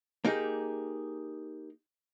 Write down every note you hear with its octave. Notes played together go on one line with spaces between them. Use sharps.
A#3 D#4 G4 G#4